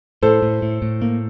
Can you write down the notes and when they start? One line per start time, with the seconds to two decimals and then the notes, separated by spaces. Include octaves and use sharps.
0.23 A2 A4 C5
0.42 A2
0.62 A2
0.82 A2
1.02 A#3